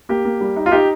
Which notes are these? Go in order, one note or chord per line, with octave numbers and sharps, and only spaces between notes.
A#3 G4
A#3
G3
D#4
F4
D#4 G4